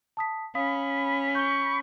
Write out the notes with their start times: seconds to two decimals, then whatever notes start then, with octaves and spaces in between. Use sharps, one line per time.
0.17 A5 D#6 B6
0.55 C#4 F5 B5 D#6
1.35 C#6 G6 G7